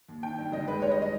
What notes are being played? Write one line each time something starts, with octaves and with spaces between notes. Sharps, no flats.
D#2
D#3 G5
G2
G#1 D#5
G#3 B4
G3 C#5
D#5
D#3
D#5